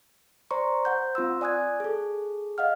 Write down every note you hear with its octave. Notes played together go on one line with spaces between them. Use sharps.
C5 D5 A#5 C6 C#6
C5 F#5 G6
C4 F4 C6 E6
D5 G#5 D#6 F#6 G#6
G#4 A4
D#5 F5 F#5 F6